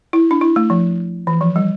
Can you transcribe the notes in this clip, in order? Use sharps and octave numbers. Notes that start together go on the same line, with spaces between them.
E4
D4
E4
A3
F3
E3
F3
G3